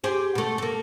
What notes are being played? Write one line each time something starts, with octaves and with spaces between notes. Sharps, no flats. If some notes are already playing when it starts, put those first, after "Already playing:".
G4 G#4 C5
B2 A3
A#3 A4